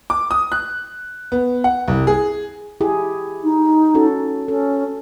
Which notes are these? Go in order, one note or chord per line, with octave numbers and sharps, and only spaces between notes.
D6
D#6
F#6
B3
F#5
C2
G#4
E4 G4 G#4
D#4
C#4 F#4 A4
C#4 A4